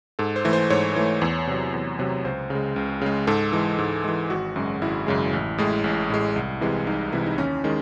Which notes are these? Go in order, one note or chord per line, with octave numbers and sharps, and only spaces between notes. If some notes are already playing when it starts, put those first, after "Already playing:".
G#2 A4
C5
E3 A3
C5
G#2 C#5
E3 A3
E2
C3 F#3
E2
C3 F#3
C#2 C5
C#3
G#3
C#2
C#3 G#3
G#2 A4
E3 G#3
G#2
E3 G#3
G#1 F#4
F#2 C#3 G#3
G#1 E4
F#2 C#3 G#3
A1
A2 G#3
A1
A2 G#3
C2
C3 E3 G#3
C2 D#4
C3 E3 G#3 E4
D#4
D#2 C#4
D#3 G#3